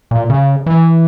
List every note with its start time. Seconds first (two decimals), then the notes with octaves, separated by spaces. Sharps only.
0.11 A#2
0.30 C#3
0.66 E3